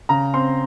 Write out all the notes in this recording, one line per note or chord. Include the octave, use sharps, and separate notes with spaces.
C#3 A#5
C4 C6